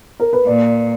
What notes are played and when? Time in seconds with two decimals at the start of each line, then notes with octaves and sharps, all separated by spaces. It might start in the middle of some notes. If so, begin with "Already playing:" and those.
0.20 A#4
0.33 B4
0.46 A#2 D5